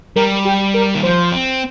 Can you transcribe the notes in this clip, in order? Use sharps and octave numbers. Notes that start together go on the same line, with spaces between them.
G3 A#4
G4
A#4
D#3
F3 C5
C4